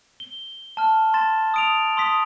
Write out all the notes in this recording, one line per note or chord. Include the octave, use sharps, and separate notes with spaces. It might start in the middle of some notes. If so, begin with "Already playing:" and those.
G7
A5 F6
C6 A6 E7
D#6 D7 F7
C6 D#6 B6